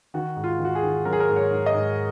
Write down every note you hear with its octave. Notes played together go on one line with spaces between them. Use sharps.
D#3 F#4
G#2
F4
D#3
F#4
G#4
D#3
F#3 A#4
G#4
A#4
G#2
C#5
G#2
D#5
G#2